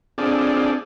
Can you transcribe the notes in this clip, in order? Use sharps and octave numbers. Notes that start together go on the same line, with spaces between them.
C4 D4 F4 G#4 A4 D5